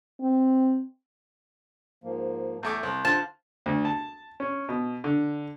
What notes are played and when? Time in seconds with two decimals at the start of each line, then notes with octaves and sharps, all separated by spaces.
0.20 C4
2.04 G#2 F3 A#3
2.63 E2 A3 D6 G6
2.83 C2
3.05 D3 F4 C5 A5
3.66 D2
3.85 A5
4.40 C#4
4.69 B2
5.04 D3